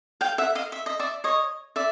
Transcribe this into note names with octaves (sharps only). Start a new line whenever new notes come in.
F5 G5
E5 F#5
D#5 F5
E5
D#5
D5 E5
C#5 D#5
D5 E5